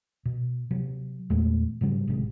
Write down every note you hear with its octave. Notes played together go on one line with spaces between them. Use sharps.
B2
C3 F#3
E2 A#2 G#3 A3
G#2 C#3 F#3 G3
G#1 A2 C3 G#3